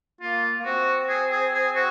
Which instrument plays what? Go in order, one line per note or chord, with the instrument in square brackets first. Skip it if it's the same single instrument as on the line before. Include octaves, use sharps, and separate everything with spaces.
[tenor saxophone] A#3 [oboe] F4
[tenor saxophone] A#3
[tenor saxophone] C4 [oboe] F#4
[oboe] G#4
G#4
G#4
F#4